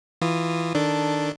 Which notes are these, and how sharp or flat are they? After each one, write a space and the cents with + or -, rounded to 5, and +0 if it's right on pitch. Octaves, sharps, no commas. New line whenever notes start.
E3 +0 F4 +0 D#6 -15
D#3 +0 D4 +0 A4 +5